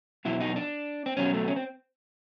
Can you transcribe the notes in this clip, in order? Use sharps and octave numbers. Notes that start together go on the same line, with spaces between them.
E2 B2 F#3 E4
D#4
D4
C4
E2 B2 F#3 C#4
A3
C#4
C4